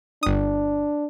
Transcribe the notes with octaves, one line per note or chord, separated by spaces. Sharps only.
G1 D4 D#6